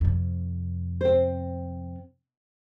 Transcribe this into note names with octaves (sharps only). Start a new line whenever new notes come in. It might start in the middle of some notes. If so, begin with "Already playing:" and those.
F2 C3
C4 C5